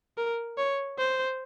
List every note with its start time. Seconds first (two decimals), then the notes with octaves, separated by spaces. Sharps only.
0.18 A#4
0.58 C#5
0.99 C5